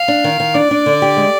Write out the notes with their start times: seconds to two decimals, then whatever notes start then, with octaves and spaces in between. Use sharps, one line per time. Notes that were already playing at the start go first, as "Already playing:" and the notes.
Already playing: F5
0.08 D4
0.24 D#3
0.40 D#3
0.55 D4 D5
0.71 D4
0.86 D3
1.02 G4
1.17 G#3